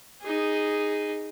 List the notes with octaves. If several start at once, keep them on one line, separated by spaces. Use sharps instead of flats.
D#4 G#4